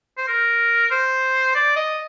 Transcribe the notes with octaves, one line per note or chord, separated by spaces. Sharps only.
C5
A#4
C5
D5
D#5